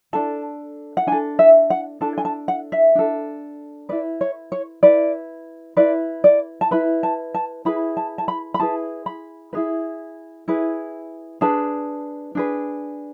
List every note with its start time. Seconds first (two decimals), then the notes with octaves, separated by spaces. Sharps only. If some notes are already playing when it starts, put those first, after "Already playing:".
0.13 D4 A4 A5
0.97 F#5
1.07 D4 G#5
1.12 A4
1.39 E5
1.70 F#5
2.01 D4 A4 A5
2.18 G#5
2.25 A5
2.48 F#5
2.72 E5
2.95 D4 A4
3.89 E4 B4 D5
4.21 C#5
4.52 C#5
4.83 E4 B4 D5
5.77 E4 B4 D5
6.24 D5
6.61 A5
6.71 E4 B4 B5
7.03 A5
7.35 A5
7.65 E4 G#4 B4 B5
7.97 A5
8.18 A5
8.28 B5
8.54 B5
8.60 E4 G#4 B4 A5
9.06 B5
9.53 E4 G#4 B4
10.48 E4 G#4 B4
11.41 D4 G#4 B4 A5
12.35 D4 G#4 B4